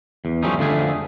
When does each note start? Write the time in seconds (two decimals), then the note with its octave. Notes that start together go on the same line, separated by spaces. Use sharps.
0.25 E2
0.43 F3 G3 A3 C#4 D#4
0.58 F2 D3 F3 A3 G#4